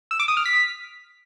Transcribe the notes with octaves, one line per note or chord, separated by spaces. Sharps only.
E6
D6
D#6
F6
B6